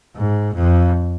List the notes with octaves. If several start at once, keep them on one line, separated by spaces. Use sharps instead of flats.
G#2
F2